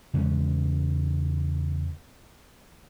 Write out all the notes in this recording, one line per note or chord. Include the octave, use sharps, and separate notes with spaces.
E2 C#3 G#3 C#4